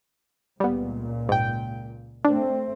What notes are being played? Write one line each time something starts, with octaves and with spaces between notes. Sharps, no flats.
C#2 A#2 G3 B3
G#2 G5
A3 C4 D4